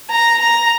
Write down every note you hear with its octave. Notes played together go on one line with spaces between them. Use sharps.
A#5
A#5